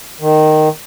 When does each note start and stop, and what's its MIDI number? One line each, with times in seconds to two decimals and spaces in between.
0.21 0.69 51